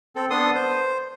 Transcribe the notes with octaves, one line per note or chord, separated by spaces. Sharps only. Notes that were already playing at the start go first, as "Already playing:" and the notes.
C4 A4
B3 D4 A4 C6 D#6
C5